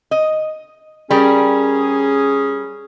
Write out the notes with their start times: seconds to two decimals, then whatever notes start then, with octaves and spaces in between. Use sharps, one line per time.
0.11 D#5
1.11 G3 C#4 G#4 A#4